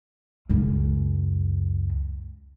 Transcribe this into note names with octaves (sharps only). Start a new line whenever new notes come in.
C#2 F#2